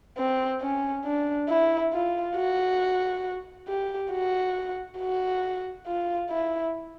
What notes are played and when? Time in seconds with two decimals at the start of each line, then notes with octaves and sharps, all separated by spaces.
0.18 C4
0.61 C#4
1.05 D4
1.49 E4
1.93 F4
2.36 F#4
3.68 G4
4.11 F#4
4.99 F#4
5.86 F4
6.30 E4